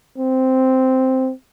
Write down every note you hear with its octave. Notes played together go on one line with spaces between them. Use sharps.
C4